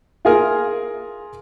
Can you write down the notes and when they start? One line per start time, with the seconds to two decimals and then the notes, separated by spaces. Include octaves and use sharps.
0.25 F4 G#4 A#4